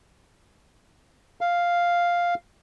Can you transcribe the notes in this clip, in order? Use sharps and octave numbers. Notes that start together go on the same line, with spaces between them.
F5